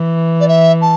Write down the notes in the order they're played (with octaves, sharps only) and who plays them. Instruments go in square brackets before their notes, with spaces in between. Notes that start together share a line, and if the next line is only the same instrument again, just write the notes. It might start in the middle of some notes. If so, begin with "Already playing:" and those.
Already playing: [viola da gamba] E3
[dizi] D5
E5
A5